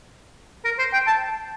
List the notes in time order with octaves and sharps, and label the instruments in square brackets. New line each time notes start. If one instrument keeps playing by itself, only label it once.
[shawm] A#4
C5
G5
A5